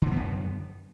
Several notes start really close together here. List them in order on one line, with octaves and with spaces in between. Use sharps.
D3 A#3 B3 F#2